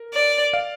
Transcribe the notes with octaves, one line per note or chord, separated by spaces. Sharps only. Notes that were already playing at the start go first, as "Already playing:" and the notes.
Already playing: A#4
D5
D5 F5